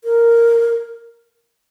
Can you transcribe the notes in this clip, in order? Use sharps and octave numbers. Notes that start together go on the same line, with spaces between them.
A#4